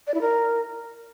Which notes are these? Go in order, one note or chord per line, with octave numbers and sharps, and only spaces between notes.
D5
E4
A#4